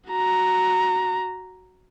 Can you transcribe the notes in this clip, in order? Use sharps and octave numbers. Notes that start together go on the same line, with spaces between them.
F#4 A#5